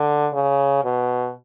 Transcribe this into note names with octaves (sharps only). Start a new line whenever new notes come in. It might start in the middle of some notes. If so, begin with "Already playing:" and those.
Already playing: D3
C#3
B2